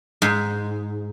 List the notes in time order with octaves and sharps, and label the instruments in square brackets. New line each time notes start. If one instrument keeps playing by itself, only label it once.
[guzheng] G#2